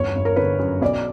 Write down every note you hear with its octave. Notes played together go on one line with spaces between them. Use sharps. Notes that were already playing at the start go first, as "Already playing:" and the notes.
Already playing: G1 E2 C#5
G1
A#4
D3 B4
F#2
B1 D5